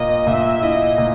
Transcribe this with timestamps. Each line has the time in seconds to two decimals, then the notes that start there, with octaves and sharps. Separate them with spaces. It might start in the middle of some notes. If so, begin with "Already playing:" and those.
Already playing: A#2 A#3 D#5
0.27 A#2 E5
0.62 E4 D#5
0.98 A#2